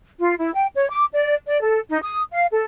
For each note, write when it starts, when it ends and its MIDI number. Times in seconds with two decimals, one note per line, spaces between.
0.20 0.34 65
0.38 0.53 64
0.55 0.67 79
0.75 0.87 73
0.89 1.05 86
1.12 1.35 74
1.47 1.59 74
1.62 1.79 69
1.89 1.98 63
2.02 2.22 87
2.32 2.45 77
2.52 2.65 69